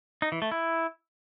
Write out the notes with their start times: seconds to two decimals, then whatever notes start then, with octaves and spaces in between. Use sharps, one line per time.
0.22 D#4
0.32 E3
0.42 A3
0.52 E4